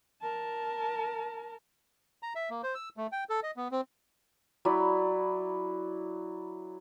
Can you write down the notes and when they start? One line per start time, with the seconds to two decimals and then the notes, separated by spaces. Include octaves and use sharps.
0.22 A#4 A5
2.23 A#5
2.35 E5
2.50 A#3
2.63 C5
2.75 E6
2.97 A3
3.12 G5
3.29 A4
3.43 D#5
3.56 B3
3.71 C4
4.65 F#3 E4 D5 B5